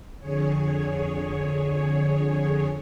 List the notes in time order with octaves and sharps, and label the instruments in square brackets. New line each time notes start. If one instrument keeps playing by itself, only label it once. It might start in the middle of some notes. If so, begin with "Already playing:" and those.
[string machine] F2 D3 G#4 C#5